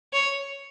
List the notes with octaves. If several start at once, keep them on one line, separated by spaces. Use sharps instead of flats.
C#5